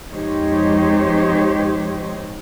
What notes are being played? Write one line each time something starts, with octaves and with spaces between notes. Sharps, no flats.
F2 G#3 D#4 G4 C5 C#5